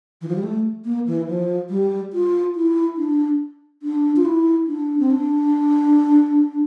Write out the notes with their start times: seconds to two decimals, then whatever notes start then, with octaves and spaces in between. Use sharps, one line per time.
0.22 E3
0.28 F3
0.35 G3
0.43 A3
0.85 A#3
1.07 E3
1.28 F3
1.70 G3
2.13 F4
2.56 E4
2.98 D4
3.83 D4
4.16 F4
4.26 E4
4.68 D4
4.99 C4
5.11 D4